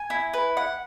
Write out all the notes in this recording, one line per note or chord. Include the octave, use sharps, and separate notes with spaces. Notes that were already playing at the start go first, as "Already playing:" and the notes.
Already playing: G#5
E4
B4
F#5